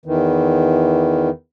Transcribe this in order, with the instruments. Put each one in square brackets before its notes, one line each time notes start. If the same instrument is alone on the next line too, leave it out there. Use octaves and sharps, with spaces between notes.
[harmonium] E2 D#3 E3